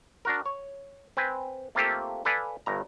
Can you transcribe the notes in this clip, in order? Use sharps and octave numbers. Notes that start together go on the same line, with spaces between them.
D4 F#4 A#4
C#5
C4 B4 G5 G#5
A3 A#3 C4 F4 G4 A4
A4 B4 D5 F5 G#5 A5
G1 G2 A#5